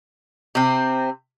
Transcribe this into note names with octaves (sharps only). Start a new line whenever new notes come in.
C3 C4